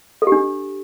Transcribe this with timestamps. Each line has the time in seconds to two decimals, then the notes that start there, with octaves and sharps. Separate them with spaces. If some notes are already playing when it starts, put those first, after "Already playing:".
0.22 A4
0.27 G4
0.32 D4